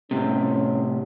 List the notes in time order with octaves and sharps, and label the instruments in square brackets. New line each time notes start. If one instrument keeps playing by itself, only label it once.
[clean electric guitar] A2 C3 [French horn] C#4